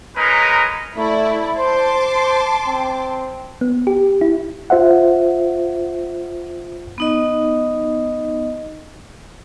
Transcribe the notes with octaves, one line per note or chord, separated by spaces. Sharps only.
G#3 C#4 D#4 A#4 B4
A3 E4 D5
C5 A5 C6 D6
C5
C4
B3
G4
E4
F4 C5 E5 F#5
B3 D#4 D#5